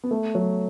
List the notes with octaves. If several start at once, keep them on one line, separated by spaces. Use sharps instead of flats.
B3
A3
F#3